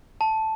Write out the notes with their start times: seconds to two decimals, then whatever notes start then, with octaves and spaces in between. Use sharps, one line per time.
0.21 A5